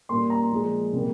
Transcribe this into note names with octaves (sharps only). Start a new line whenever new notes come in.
A#2 G3 A#3 C6
A#5
A#2 F3 G#3
C3 G3 A#3